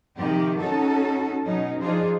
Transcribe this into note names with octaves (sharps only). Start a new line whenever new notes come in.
C3 D#3 F3 G4
C#4 D#4 F#4 A4
B2 F#3 C#4 D#4
F3 D4 D#4 F4 G#4 C5